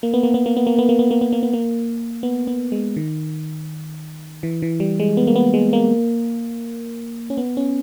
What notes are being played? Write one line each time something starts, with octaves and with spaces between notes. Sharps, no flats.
A#3
B3
A#3
B3
A#3
B3
A#3
B3
A#3
B3
A#3
B3
A#3
B3
A#3
B3
B3
G#3
D#3
E3
E3
G3
G#3
B3
A#3
B3
G#3
A#3
C#4
B3
C#4